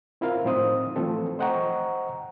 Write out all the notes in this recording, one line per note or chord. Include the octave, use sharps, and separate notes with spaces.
C4 E4 F4 A#4 F5
A2 F3 C4 D#4 C5 D#6
E3 F3 A3 C4 A4
C5 D#5 F#5 G5 A#5 C#6